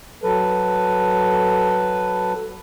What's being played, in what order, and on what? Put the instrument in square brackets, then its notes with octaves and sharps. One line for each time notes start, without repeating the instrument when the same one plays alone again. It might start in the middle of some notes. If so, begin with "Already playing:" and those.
[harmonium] F#3 A4 B4